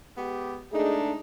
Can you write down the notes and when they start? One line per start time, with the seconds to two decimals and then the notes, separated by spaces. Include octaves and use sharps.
0.16 G#3 B3 G4
0.72 G#3 A3 D4 D#4 G#4